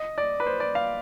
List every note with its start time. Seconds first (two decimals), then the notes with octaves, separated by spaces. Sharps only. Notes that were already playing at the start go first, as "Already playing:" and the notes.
Already playing: D#5
0.18 D5
0.40 B4
0.47 C5
0.60 D5
0.75 F5